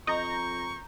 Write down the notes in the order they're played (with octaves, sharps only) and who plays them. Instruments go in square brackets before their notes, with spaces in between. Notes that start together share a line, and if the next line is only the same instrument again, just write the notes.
[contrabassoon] F2 [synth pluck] D#5 [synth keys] A#5 G6 [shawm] C#6